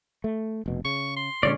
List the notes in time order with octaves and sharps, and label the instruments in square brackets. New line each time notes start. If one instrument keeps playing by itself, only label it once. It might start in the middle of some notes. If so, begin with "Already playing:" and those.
[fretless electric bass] A3
F1 B2
[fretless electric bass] C#3 [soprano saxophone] C#6
[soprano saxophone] C6
[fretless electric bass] A#2 D3 G#3 [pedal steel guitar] C#4 C#5 D5